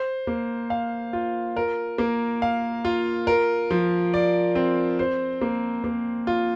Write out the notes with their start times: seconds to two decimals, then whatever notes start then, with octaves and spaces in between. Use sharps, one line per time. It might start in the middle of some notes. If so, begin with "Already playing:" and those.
Already playing: C5
0.27 A#3
0.70 F5
1.13 F4
1.57 A#4
1.98 A#3
2.42 F5
2.85 F4
3.27 A#4
3.70 F3
4.14 D5
4.55 C4
4.99 C5
5.41 A#3
5.84 A#3
6.27 F4